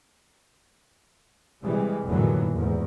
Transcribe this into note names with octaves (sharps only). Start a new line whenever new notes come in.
C3 E3 G3 G#3
F1 D#2 A2 D3 E3 F#3
E2 G#2